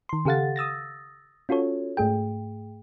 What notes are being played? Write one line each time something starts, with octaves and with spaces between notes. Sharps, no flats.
D#3 C6
C#3 G4 A4 F5 F#5 A6
D#6 E6 A6 A#6
C#4 F4 F#4 A4 C#5
G#2 A3 G#4 G5